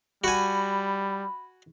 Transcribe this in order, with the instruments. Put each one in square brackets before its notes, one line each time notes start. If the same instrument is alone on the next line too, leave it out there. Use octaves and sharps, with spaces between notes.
[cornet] G3 [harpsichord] F#4 G#5 [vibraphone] B5